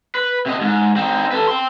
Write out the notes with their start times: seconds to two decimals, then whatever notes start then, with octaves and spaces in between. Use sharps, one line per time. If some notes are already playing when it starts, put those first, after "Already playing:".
0.15 B4
0.46 C3 D#5
0.61 G#2
0.96 C4 D#4
1.31 A4 B4
1.48 G5 C6